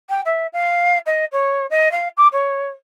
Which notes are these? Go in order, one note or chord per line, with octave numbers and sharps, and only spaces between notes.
G5
E5
F5
D#5
C#5
D#5
F5
D6
C#5